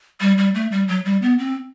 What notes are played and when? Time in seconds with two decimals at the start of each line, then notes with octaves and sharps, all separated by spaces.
0.21 G3
0.38 G3
0.55 A3
0.72 G3
0.88 F#3
1.05 G3
1.22 B3
1.39 C4